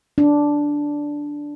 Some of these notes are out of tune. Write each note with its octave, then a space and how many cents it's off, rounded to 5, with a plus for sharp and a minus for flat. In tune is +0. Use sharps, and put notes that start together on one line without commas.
D4 -5